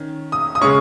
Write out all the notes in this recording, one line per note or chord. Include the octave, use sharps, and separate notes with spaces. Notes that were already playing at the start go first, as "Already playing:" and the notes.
Already playing: D#3 C#4
D#6
D#6
C#3 G#3 C#4 C#6